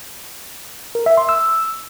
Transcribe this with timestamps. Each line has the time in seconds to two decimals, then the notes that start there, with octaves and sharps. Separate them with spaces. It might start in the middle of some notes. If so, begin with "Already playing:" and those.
0.95 A#4
1.06 E5
1.18 C6
1.29 E6